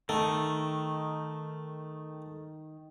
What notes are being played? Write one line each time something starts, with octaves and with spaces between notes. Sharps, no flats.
D#3 A3